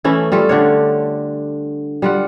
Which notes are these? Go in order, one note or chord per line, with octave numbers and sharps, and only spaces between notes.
E3 A3 C#4 E4
G3 F4 A4
D3 D4 C#5
G3 F4 F#5